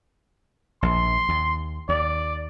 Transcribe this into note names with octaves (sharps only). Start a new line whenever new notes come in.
A#1 C6
D#2
D#2 D5